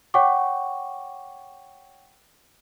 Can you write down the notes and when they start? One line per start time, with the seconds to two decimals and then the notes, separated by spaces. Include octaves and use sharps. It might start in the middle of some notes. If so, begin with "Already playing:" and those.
0.14 C#5 F#5 G5 C#6 D6